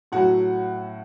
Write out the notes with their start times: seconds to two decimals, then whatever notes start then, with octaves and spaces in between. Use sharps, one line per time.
0.12 A2 F#3 F#4 F#5